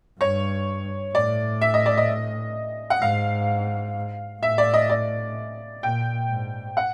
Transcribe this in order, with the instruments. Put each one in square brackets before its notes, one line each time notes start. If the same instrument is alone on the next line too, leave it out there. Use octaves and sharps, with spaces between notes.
[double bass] G2 [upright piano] C#5
[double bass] A2 [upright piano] D5
[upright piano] E5
D#5
D5
D#5
F#5
[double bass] G#2 [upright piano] F5
[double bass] A2 [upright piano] E5
[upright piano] D5
D#5
D5
[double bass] A#2 [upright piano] G5
[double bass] G#2
[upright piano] F#5